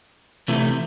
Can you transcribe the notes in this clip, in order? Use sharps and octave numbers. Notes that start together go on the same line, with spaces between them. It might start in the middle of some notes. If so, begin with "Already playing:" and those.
C3 E3 A3